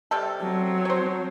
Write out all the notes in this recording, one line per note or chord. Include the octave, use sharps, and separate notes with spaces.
C3 G3 A4
F#3 C4
C5 C#5